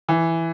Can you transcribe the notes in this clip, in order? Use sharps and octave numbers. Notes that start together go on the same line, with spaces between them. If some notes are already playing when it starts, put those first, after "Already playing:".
E3